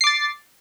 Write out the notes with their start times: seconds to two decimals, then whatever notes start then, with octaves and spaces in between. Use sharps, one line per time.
0.01 C7
0.04 D6
0.07 A6